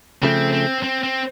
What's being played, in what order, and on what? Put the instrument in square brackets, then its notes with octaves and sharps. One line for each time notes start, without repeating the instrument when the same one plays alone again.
[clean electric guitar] C#3 F3 A3 [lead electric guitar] C4
[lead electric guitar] C4
C4
C4